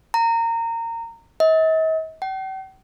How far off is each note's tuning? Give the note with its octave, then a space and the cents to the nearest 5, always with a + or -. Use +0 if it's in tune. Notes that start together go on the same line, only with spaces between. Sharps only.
A#5 -20
D#5 +45
G5 -45